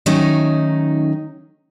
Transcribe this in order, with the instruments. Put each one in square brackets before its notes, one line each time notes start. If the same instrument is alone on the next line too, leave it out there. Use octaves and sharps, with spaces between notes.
[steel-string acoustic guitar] D#3 F#3 A3 C#4 D#4